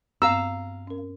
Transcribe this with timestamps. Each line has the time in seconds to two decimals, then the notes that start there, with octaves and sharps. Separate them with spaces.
0.22 G2 B3 C4 F5 A#5 E6
0.87 C#4 A#4